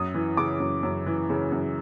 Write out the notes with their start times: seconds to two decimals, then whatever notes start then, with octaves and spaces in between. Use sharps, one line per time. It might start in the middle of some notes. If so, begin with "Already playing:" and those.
Already playing: F#2 D#6
0.14 E3
0.37 C#3 D6
0.60 F#2
0.83 F#2
1.06 E3
1.30 C#3
1.52 F#2